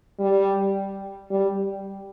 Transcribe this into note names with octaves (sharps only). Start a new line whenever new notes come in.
G3
G3